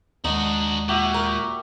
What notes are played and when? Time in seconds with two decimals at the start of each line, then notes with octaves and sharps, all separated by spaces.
0.24 D#2 G#3 D4 D#4 F#4
0.89 A#2 F#4 G4 E5
1.14 A#4